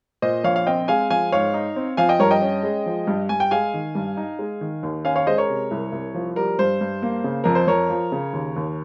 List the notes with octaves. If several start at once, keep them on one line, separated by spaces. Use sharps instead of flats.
A#2 C5 D#5
A#1 C#5 F5
F5
C4 D#5 G5
G#3 F5 G#5
F3 F5 G#5
G#2 C#5 F5
D#4
C4
F3 F5 G#5
D#5 G5
G2 A#4 C#5
D#5 G5
C#4
G#3
F3
G2
G2 G#5
G5
G#3 F5 G#5
D#3
G2
D#4
G#3
D#3
D#2
C#4 F5 G#5
C#5 F5
G#3 C5 D#5
A#4 C#5
C3
C2
C2
F3
G3 A#4
G2 C5
G2
A#3
C#3
F2 A#4
C5
F2 A#4 C#5
F3
C#3
D#2
D#2